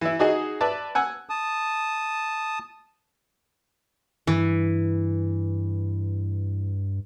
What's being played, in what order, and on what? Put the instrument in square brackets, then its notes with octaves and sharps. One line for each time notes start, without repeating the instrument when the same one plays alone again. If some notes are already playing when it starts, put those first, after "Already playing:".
[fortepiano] E3 E4
D#4 F#4 G#4 D#5
B4 D5 E5 A5
F#5 G#5 E6
[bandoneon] A5 D#6
[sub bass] G2 [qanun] E3